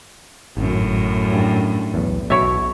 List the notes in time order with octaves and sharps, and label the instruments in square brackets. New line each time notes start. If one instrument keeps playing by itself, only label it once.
[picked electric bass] G#1 [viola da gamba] F#2 A2
[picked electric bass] G2
B1 E2
[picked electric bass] B1 B2 [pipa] E4 C#5 E5